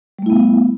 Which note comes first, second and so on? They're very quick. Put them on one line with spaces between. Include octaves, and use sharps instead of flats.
G3 A3 E4 B3